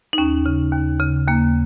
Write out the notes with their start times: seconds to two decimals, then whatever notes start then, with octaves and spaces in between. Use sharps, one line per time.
0.13 D#4
0.18 D#2 C#4
0.46 C#3
0.72 D#2
1.00 C#3
1.28 D#2 A#3